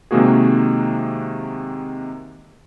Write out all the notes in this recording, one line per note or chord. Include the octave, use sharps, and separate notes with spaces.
C3 D#3 G#3 A#3 F#4 G#4